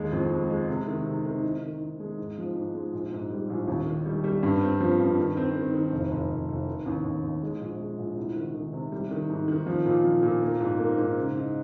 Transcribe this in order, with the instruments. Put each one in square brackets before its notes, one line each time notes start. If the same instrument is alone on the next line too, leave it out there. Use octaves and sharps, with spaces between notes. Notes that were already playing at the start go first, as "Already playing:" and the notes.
Already playing: [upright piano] D#2 G#3
F2
G#3
G#3
C3
D#3
C3
D#3
D#3
D#3
D#3
G#3
G#2
F3
G#2
G#3
A#1
G#2
G3
A#1
D#2
D#3
G3
G3
G2
C4
F3
G2
D#3
C4
D#3
D#3
F1
F1
F1
F1
D#3
D#2
D#2
D#2
G#3
A#1
G#3
A#1
C2
D#3
D#3
C3
G3
D#3
G#2
D#3
F3
A#2
F3
A#2
A#3
G#2
A#3
G#2
C#3
D#4